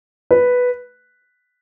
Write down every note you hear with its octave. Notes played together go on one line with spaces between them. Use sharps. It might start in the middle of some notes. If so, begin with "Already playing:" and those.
B4